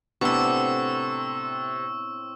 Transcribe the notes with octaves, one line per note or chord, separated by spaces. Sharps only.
A2 C3 B3 C4 D4 B5 C#6 E6